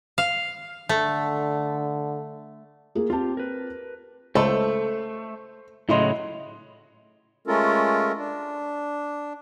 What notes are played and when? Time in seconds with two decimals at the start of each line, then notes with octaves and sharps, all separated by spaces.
0.18 F5
0.89 D3 A3
2.95 A#3 F4 G#4
3.10 C4 F4 G4 A5
3.37 A#4 B4
4.35 C#2 A3 A4 C5
5.89 A2 C#3 F#3 E4 D#5 C6
7.47 G#3 A3 C#4 F4 A4 A#4
8.17 D4